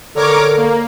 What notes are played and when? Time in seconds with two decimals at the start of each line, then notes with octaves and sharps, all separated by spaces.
0.15 D3 A#4 C#5 D6
0.57 A#3